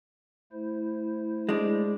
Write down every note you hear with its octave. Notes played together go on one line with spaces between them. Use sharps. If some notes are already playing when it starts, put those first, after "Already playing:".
A3 E4 C5
G#3 D4